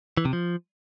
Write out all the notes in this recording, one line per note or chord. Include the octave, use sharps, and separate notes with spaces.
E3
C3
F3